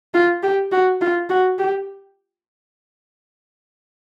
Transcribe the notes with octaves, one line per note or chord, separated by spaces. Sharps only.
F4
G4
F#4
F4
F#4
G4